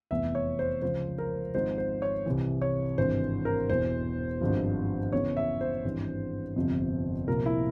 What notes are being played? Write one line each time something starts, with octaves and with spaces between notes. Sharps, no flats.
F1 E2 E3 E5
C#5
C5
C#2 C#3 F3 C5
A#4
G#1 G#2 F3 C5
C5
C#5
C2 C3 E3
C#5
G#1 G2 E3 C5
A#4
E1 E2 E3 C5
G#1 G2 F3
E2 C#3 E3 C#5
E5
C5
G#1 G2 E3
G1 F2 C3 F3
C2 A#2 F3 A#4
E4